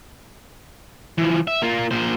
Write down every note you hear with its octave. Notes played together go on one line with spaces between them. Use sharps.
E3 F3
E5
A#3 F4
A#2 C5